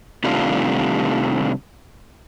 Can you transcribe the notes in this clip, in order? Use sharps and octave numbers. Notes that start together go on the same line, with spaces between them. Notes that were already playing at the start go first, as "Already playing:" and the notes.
C3 D#3 G3 A3 D4 F4